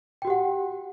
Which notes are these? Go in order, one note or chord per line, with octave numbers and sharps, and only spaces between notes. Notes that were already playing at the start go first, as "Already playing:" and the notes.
F#4 G4 F#5 G5